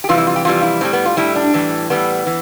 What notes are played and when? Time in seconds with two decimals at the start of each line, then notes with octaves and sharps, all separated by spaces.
0.04 G4
0.09 F2 C3 E3 G3 F4
0.18 E4
0.27 F4
0.36 G4
0.45 F2 C3 E3 G3 F4
0.63 E4
0.81 A2 G3 C4
0.93 B3
1.05 F4
1.17 A2 G3 E4
1.36 D4
1.54 A2 E3 G3
1.90 A2 E3 G3 B3
2.26 E3